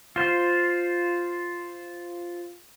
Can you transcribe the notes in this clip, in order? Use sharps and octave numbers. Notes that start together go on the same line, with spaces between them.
F4 C5